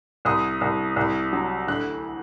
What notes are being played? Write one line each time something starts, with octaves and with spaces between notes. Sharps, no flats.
C2 D#6
C2
C2
F#3
D2 F#6